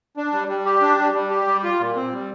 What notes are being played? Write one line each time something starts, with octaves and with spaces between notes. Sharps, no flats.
D4
G3
G3
G4
D4
G3
G3
G4
G3
F4
A#2
C4
G3